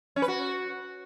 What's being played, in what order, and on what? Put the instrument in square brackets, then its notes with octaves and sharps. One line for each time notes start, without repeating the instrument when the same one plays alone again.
[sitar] C#4
B4
F#4